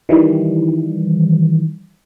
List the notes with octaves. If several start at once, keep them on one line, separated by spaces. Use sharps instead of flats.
D#3 E3 G3